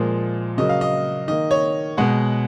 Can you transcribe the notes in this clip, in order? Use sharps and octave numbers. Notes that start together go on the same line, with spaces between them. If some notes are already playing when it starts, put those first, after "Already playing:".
Already playing: A#2 F3 G#3
C#3 F#3 A#3 D#5
F5
D#5
D#3 A#3 D#5
C#5
B2 G#3 F#5